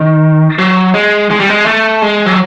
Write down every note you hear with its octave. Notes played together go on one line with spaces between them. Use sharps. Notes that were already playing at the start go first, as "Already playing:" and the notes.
Already playing: D#3
F#3
G#3
G#3
G3
G#3
A3
G#3
F#3